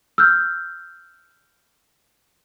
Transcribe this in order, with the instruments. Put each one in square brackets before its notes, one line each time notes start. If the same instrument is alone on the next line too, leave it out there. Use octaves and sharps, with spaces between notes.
[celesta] E6 F6 G6